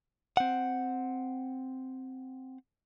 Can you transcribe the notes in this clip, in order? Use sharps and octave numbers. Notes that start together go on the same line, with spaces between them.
C4 F#5